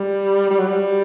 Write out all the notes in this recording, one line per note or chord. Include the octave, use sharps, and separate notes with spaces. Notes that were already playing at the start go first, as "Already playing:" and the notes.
Already playing: G3
G3
F#3
G3